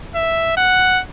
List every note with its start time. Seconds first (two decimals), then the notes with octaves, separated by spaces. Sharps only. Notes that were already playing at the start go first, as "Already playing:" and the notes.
0.15 E5
0.57 F#5